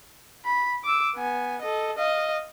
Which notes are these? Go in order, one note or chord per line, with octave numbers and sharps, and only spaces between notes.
B5
D6 E6
B3 G#5
A4 D#5
D#5 F5